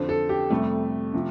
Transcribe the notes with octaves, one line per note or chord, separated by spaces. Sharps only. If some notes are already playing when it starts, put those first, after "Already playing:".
Already playing: F2 D3 F3 C5
A4
G4
F2 C3 G3 A3
C3 F3